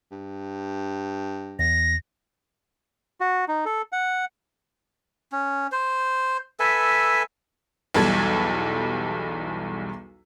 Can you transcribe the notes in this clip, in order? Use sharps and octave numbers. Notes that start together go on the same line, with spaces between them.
G2
E2 A#6
F#4
D#4
A4
F#5
C#4
C5
A4 B4 E5 G#5
B1 E2 G3 A4 G#6